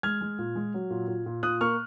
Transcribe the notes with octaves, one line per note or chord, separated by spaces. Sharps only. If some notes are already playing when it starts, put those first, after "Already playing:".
G#3 F6 G#6
G#3
A#2
G#3
F#3
A#2
A#2
A#2
A#2 D#6 F#6
A#3 C#6 F6